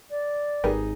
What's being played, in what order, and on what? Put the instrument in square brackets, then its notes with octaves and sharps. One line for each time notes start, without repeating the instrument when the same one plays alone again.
[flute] D5
[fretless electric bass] G#1 [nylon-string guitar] D#4 G#4 G#5 [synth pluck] G4 A#4 B4